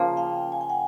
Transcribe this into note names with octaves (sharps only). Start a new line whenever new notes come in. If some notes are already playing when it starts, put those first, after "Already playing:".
Already playing: C#3 F3 A#3
F5 G5
G#5
G5
F#5 G#5